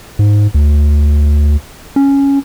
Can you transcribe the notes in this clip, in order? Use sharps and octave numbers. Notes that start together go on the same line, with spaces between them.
G#2
D2
C#4